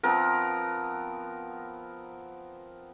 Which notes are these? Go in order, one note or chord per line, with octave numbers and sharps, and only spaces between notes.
F3 B3 C4 A#4